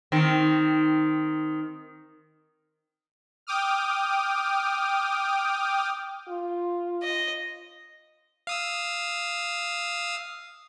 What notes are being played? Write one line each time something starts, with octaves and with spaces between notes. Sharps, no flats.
D#3 C4
G5 D6 D#6 F6
F4
D#5
F5 D#6 E6